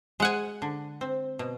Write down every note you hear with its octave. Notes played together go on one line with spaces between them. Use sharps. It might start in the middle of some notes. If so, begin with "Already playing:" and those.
G#3 F#5 G#5
D3
C4
B2